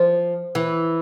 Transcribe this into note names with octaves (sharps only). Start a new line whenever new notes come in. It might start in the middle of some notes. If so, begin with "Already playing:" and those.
Already playing: F3
E3